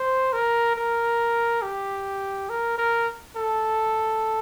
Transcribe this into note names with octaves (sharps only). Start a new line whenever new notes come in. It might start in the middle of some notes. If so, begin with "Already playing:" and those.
Already playing: C5
A#4
A#4
G4
A#4
A#4
A4